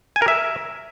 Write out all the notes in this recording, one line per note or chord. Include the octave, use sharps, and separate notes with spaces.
G#5
A#4
E5